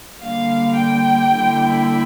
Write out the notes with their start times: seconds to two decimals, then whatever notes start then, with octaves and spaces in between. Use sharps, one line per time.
0.20 D3 G3 A#3 F5
0.76 G5
1.32 D3 G3 A#3 E4